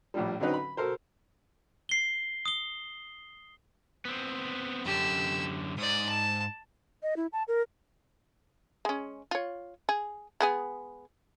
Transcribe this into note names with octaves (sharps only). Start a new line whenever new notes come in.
A#1 A2 F3 G3
D3 F#3 C4 C#4 D#4 B4
B5
B2 A4 A#4 C5
C7 G7
D#6 G7
B3 C4
F#2 D3 G4 E6
G#2 D5 D#6
A5
D#5
E4
A5
A#4
G#3 C#4
F4 C#5
G#4
G#3 B3 G#4